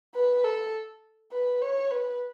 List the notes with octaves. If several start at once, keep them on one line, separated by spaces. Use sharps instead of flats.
B4
A4
B4
C#5
B4